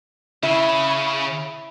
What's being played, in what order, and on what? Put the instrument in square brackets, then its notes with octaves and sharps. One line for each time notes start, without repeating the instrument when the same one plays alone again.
[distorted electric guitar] C#3 [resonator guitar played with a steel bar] E4